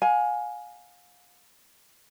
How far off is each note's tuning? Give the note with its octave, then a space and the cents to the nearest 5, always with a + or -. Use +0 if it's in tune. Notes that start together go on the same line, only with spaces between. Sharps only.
F5 +35 G#5 +5